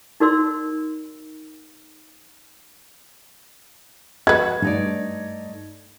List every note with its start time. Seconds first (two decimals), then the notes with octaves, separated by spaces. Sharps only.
0.20 D#4 F#4 A#4 D5 C6 E6
4.27 G#3 F#4 B4 F#5 G#6
4.62 G2 A3 D#4 D5